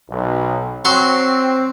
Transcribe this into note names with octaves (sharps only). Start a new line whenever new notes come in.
B1
F#3 C4 C6 C#6